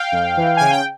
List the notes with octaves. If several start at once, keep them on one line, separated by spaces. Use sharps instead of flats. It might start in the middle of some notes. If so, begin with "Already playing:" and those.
Already playing: F5 G5
F2
E3
C#3 G#5
G5